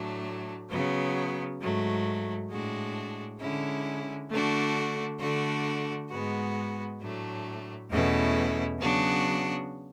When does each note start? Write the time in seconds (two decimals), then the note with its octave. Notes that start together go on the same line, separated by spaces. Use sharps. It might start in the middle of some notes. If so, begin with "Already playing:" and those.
Already playing: A2 F#3 A3 D4
0.70 C#3 F#3 B3
1.60 G#2 F#3 A3
2.50 A2 G#3 D4 F#4
3.40 D3 G#3 C#4 E4
4.31 D3 A3 D4 F#4
5.20 D3 A3 D4 F#4
6.10 G#2 G#3 B3 F#4
7.01 A2 F#3 A3 D4
7.90 E2 B2 A3 C#4 E4
8.80 C#3 F#3 B3 D4 F#4